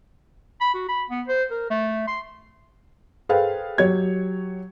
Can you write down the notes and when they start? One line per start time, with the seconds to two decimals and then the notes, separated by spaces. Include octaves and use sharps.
0.61 B5
0.74 F#4
0.89 B5
1.10 B3
1.28 C5
1.51 A#4
1.70 A3
2.08 C6
3.29 G#4 A4 B4 C5 F5 G5
3.78 F#3 G4 C#5 G#6